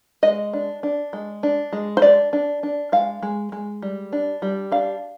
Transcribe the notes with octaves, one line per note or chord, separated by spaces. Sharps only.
G#3 D#5
D4
D4
G#3
D4
G#3
C5
D4 D5
D4
D4
G#3 F5
G#3
G#3
G3
D4
G3
D4 F5